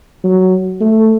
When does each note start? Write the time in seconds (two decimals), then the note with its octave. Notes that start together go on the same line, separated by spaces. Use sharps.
0.24 F#3
0.81 A3